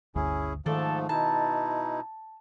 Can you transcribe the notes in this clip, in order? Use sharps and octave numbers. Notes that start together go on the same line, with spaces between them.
G1 D2 C#4 E4 G#4
G#2 D#3 F3 A3 D4 A4
B2 D#4 E4 A5